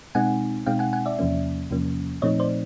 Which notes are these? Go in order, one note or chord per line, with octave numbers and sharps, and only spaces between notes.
B2 G#3 C4 D#4 F#5 G#5
B2 G#3 C4 D#4 F5 G5
F#5 G#5
F#5 G#5
D5 E5
E2 C3 F3 A#3 C#4
E2 C3 F3 A#3 C#4
A#2 F3 A3 C4 D#4 C#5 D#5
C5 D5